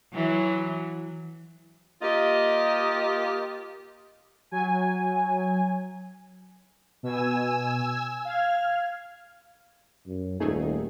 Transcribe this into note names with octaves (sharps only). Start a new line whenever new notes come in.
E3 F#3
A#3 F4 G4 D#5
F#3 G#5
B2 G#5 E6
F5 F6 G#6
F#2
D#1 A3 D#4 G#4